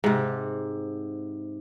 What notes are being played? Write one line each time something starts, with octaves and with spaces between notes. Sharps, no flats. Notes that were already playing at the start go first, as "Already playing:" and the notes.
G#2 C3